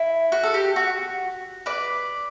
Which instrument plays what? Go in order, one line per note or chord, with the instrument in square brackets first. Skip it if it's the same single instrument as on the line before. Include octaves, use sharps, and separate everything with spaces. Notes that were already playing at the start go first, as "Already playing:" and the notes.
Already playing: [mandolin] E4
F#4
A4
G4
F#4
B4 D5